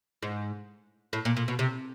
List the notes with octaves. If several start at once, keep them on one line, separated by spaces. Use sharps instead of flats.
G#2
A2
A#2
A#2
B2
C3